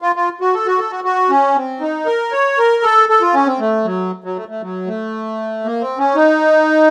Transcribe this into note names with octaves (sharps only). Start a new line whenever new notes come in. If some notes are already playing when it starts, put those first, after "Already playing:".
F4
F4
F#4
A4
F#4
A4
F#4
F#4
C#4
C4
D#4
A#4
C#5
A#4
A4
A4
F4
C#4
C4
A3
F#3
F#3
A3
A3
F#3
A3
A#3
C4
C#4
D#4